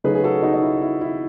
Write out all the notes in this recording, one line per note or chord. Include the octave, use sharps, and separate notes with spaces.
C#3 F#3 A3 D#4 G#4 B4
G#4
F#4 A4
D#4 F#4
D#4
E4
E4
E4